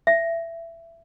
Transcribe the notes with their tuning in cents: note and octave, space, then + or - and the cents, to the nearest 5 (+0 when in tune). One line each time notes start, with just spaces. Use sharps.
E5 +20